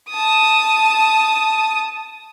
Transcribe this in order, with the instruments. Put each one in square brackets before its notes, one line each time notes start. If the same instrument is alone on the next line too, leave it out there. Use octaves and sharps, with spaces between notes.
[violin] A5 D#6